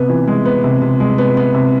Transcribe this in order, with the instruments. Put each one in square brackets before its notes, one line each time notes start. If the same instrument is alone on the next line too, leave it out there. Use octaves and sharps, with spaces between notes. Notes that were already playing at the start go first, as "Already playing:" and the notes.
Already playing: [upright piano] C3 B3
E3
G#3
B3
C3
C3
G#3
B3
B3
C3